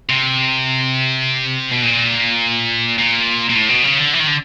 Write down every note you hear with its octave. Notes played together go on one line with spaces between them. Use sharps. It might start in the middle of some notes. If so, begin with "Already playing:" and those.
C3
B2
A#2
A#2
A#2
A2
B2
C#3
D3
E3
D#3
D3